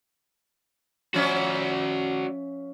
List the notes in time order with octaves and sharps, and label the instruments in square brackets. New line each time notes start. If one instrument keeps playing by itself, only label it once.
[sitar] F3 C#4 E5 [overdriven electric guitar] F#4 D5